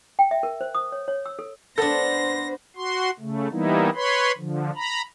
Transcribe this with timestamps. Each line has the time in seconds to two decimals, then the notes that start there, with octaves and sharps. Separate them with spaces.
0.19 G5
0.31 E5
0.43 A#4
0.61 C5
0.75 D#6
0.92 C#5
1.08 C#5
1.26 E6
1.39 A4
1.78 B3 D4 A4 C5 A#6
2.76 F#4 C6
3.20 C#3 A3
3.51 E3 G3 A#3 B3 D#4 E4
3.95 B4 C#5 B5 C6
4.38 D3 F3
4.76 A#5 B5